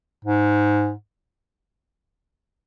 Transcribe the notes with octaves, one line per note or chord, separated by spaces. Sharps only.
G#2